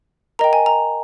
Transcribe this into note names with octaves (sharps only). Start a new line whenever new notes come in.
A#4 D#5 G5 A#5
G#5
A#5